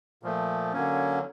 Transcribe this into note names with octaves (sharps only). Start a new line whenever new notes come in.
A#2 F3 A3
D3 F#3 A#3 C#4